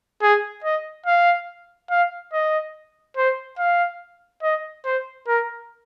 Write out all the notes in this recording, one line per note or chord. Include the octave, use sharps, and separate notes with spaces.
G#4
D#5
F5
F5
D#5
C5
F5
D#5
C5
A#4